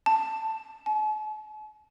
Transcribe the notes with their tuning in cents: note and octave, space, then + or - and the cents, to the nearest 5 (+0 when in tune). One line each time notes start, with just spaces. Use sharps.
A5 +10
A5 -45